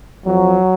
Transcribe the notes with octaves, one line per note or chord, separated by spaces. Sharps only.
F2 F3 F#3